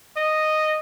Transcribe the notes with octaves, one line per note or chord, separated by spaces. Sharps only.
D#5